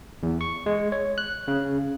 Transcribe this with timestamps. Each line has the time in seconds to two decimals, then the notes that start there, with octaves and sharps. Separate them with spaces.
0.23 E2
0.41 C#6
0.66 G#3
0.92 C#5
1.18 F#6
1.48 C#3